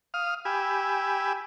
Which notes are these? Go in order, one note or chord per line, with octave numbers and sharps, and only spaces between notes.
F5 D#6 F6
G4 G#5 B5 E6